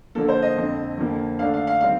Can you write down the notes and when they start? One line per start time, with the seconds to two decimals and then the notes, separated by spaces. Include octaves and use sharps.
0.15 D3 F3 A#3 A4
0.28 C5
0.42 D#5
0.56 F2 D3 F3 C4
0.98 F2 D3 F3 A#3
1.39 D3 A3 D4 F5
1.54 F5
1.67 F5
1.81 D#3 G3 C4 F5